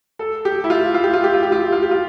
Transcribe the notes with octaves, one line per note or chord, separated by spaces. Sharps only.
A4
G4
E4
F4
F4
G4
F4
G4
F4
G4
F4
G4
F4
G4
F4